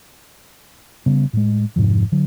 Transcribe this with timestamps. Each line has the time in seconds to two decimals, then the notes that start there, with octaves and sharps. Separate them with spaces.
1.06 C#3 G3 B3
1.33 A2 G#3
1.76 F2 G#2 C3 F3
2.12 D3 F#3